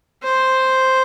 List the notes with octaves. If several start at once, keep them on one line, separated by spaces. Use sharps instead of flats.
C5